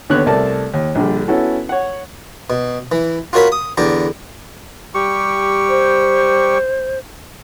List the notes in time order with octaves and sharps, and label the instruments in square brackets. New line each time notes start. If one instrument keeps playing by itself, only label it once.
[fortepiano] D#2 D3 B3 C#5 F#6
C2 A3 A#4 D5 A5
D#2
A#1 D3 G3
B3 C#4 E4 F#4 A4
C#5 F#5
[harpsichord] B2
E3
F4 F#4 A#4 C#5 B5
D#6
E2 D3 G4 A#5
[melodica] G3 G4 C#6
[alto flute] C5